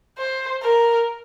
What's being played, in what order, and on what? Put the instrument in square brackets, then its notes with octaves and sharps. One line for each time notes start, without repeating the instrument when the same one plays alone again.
[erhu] C5
A#4